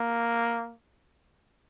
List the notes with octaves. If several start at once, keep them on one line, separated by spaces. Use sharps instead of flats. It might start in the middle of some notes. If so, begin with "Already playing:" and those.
Already playing: A#3